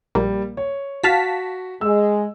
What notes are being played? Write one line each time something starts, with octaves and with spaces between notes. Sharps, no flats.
A#1 G3 A#3
C#5
F#4 F5 A5 B6
G#3 E6